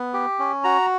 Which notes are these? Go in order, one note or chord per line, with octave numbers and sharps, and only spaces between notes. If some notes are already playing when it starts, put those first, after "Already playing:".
Already playing: B3
G4
C#4
F#4 A#5